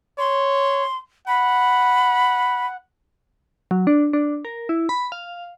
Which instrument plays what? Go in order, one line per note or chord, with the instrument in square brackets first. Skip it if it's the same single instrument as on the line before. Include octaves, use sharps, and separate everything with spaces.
[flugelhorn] C#5 [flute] C6
[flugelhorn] F#5 [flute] B5
[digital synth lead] F#3
D4
D4
A#4
E4
B5
F5